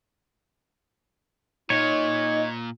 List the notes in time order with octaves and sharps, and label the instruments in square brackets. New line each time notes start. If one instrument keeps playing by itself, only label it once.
[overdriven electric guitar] A#2 [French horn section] D#4 D#5 [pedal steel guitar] C#5